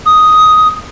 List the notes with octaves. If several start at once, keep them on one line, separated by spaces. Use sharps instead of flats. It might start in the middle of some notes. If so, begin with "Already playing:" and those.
D#6